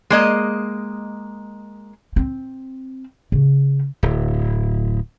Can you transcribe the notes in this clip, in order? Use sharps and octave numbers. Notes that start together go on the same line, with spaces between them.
G#3 A#3 D#5
C4
C#3
D1